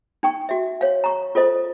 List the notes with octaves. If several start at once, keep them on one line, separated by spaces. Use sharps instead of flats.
D#4 G5 C#6
F#4 E5
C#5 F5
A#5 C#6
F4 A4 C5 D#5